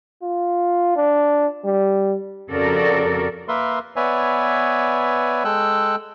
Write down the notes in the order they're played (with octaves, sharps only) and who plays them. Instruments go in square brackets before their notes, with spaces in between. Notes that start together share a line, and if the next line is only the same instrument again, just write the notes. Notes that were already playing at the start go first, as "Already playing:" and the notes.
[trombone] F4
D4
G3
[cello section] F2 C#3 F#4 A4 A#4 D5
[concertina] A#3 A#4 B4 E5 C6
B3 B4 C#5 D5 E5 G#5
G#3 A4 G5 E6 F#6